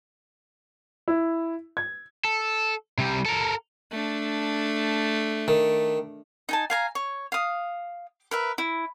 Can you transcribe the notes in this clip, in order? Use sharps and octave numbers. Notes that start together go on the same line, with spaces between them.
E4
G#6
A4
C3 G3
A4 A#4
A3 D4
D#3
D#4 G#5 A5
F5 G#5 A#5
C#5
F5 D#6
A#4 B4 E5
E4